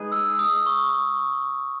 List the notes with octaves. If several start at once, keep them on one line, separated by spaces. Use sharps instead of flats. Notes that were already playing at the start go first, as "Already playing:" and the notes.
Already playing: G#3 D#4 G#4 B4
E6
D#6
C#6